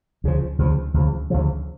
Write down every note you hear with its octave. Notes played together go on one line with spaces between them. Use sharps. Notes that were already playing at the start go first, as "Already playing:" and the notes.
D2 C#3 F3
D2 C#3 F3
D2 C#3 F3
D2 C#3 F3